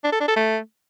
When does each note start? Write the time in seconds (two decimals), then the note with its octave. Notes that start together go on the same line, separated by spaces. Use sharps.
0.04 D4
0.12 A4
0.20 D4
0.28 A4
0.36 A3